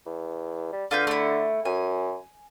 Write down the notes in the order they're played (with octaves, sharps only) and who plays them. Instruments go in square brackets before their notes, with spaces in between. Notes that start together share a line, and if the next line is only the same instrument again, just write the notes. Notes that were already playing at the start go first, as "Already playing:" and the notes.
[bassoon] E2
G3
[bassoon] D3 [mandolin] F4 B4 G6
[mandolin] A3 E4
[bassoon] F#2 [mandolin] G#5